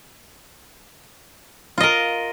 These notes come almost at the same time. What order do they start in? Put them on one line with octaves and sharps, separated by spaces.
F4 D#5 A#4